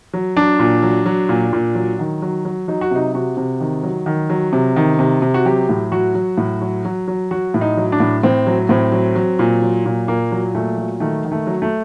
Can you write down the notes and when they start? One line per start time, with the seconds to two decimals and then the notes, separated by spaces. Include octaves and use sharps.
0.13 F#3
0.37 F#3 D4
0.59 A#2
0.83 F#3
1.06 F#3
1.29 A#2
1.53 A#2
1.75 F#3
1.99 D#3
2.22 F#3
2.45 F#3
2.68 F#3 D#4
2.81 F#4
2.91 C3 D#4
3.14 C3 F#4
3.37 C3
3.60 D#3
3.83 F#3
4.06 D#3
4.30 F#3
4.53 C3
4.76 D#3
4.99 C3
5.22 C3
5.34 F#4
5.45 F#3 G4
5.69 A2
5.92 F#3 F#4
6.14 F#3
6.38 A2
6.61 F#3
6.85 F#3
7.08 F#3
7.31 F#3 F#4
7.54 A2
7.61 D#4
7.77 F#3
7.92 D4
8.00 A2
8.23 A2 C4
8.47 F#3
8.69 A2 C4
8.92 F#3
9.15 F#3
9.39 A#2
9.62 F#3
9.86 A#2
10.08 A#2 A#3
10.32 F#3
10.55 A#2 A3
10.77 F#3
11.00 D#3 A3
11.24 D#3
11.32 A3
11.47 F#3
11.62 A3